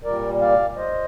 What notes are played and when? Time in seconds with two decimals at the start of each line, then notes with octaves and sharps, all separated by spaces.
0.04 A#2 G3 A#4 D5
0.41 D5 F5
0.77 C5 D#5